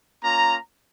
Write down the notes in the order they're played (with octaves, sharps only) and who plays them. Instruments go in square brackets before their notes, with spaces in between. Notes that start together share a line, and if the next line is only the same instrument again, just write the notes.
[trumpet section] A#3 C#4 F4 A#5